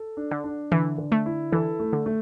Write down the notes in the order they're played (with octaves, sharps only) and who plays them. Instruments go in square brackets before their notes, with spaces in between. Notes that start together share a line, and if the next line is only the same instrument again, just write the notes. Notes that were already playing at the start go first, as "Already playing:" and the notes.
Already playing: [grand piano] A4
D4
[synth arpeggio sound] D3
[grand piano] D4
[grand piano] D3 [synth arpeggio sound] E3
[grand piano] D3
[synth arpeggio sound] A3
[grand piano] E4
[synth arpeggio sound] E3 [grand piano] A4
[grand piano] A3
[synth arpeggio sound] D3
[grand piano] A3